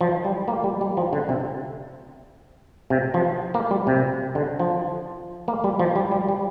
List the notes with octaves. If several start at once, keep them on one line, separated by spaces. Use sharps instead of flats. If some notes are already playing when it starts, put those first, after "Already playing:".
F3
G3
A#3
G3
G3
F3
D3
C3
C3
F3
A#3
G3
C3
D3
F3
A#3
G3
F3
G3
G3
G3